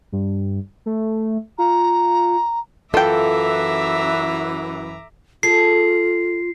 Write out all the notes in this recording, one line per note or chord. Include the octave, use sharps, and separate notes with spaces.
G2
A3
F4 A#5
F#2 E3 F4 A4 E5 G5 A#5 D6
F4 G#4 A4 C7